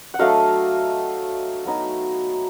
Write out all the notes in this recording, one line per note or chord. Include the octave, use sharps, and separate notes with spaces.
F#5
F#3 A3 D4 D#5 F5
F#3 B3 D#4